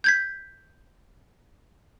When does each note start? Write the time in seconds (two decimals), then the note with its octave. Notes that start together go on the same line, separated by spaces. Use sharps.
0.04 G6 G#6 B6